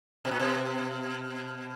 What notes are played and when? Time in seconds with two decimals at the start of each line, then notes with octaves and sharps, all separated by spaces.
0.25 B2
0.31 A#2
0.39 B2